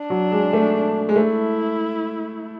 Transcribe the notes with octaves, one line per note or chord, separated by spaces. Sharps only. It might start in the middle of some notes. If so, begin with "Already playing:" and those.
Already playing: D4
F#3
G#3
A3
G#3
A3 E4